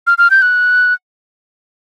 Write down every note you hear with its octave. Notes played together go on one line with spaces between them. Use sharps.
F6
F6
G6
F#6